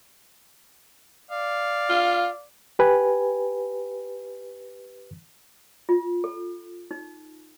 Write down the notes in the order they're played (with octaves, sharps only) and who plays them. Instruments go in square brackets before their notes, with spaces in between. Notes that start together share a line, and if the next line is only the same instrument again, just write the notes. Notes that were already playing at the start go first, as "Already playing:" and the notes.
[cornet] D5 [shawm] F5
[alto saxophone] F4
[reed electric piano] G4 B4 G#5
[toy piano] F4
A4
D#4